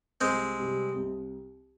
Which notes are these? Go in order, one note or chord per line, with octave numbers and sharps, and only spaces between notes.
C2 G#3 C4
C3 G3
C2